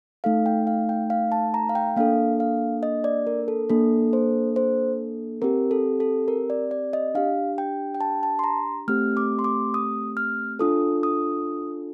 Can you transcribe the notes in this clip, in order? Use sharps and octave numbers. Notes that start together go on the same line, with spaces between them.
A3 D#4 A4 F5
G5
F5
G5
F5
A5
A#5
F5
G5
A#3 D4 A4 F5
F5
D#5
D5
A#4
A4
A#3 D4 A4
C5
C5
C4 G4 A#4
A4
A4
A#4
D5
D5
D#5
D4 G4 F5
G5
G5
A5
A5
C6
A#5
A3 C4 G4 F6
D6
C6
D6
D#6
F6
D4 F4 A4 D#6
D#6